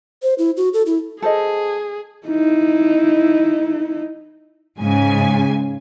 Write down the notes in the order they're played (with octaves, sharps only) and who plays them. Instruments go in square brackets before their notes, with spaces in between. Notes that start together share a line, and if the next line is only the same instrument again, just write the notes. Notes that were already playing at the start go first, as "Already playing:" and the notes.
[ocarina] C5
E4
F#4
A4
E4
[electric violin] G#4 [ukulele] A4 C5 D#5
[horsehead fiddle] D#4 E4
[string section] G#2 C#3 G#5